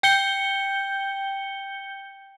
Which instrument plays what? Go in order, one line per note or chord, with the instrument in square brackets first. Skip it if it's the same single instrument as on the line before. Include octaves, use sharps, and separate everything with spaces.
[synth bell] G5 G6 C#7 G7